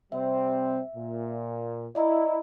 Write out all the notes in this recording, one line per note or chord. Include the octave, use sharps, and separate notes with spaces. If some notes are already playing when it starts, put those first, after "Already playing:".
C3 G3 C4 E5
A#2
E4 D5 D#5 A#5